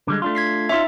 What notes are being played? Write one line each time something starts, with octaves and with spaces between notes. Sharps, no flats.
D3 G3 G#3
A3 D4 F4
G#6 B6 C7
C#4 D#4 F4 E5